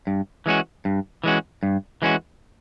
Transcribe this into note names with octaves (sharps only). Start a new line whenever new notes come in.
G2
E3 G#3 C#4 F#4
G2
E3 G#3 C#4 F#4
G2
E3 G#3 C#4 F#4